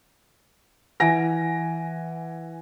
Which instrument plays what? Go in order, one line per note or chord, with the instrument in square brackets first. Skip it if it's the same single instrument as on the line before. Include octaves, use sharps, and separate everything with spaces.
[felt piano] E3 F#5 G#5 A#6 D7